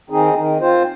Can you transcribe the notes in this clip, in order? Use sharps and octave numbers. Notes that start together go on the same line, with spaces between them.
D#3 C4 D#4 G#4
D#3
C4 F4 C5